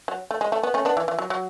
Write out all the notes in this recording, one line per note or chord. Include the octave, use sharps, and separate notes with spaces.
F#3
A3
G#3
A3
B3
A3 C#4
B3 D4
E3
E3
F#3
F#3